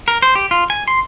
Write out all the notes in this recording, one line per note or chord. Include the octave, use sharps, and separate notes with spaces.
A#4
C5
G4
F4
G#5
C6